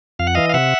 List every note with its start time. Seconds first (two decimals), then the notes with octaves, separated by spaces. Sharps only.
0.19 F2 F5
0.27 F#5
0.35 E3 D#5 F5
0.49 F5
0.54 C3 E5 F#5